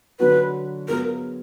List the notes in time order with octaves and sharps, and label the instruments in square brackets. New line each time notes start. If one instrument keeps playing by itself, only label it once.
[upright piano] D3 F#3 D4 F#4 [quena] B4
[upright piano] F#3 B3 F4 G#4 [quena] A#4